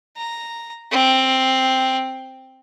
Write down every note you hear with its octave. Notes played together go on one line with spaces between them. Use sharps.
A#5
C4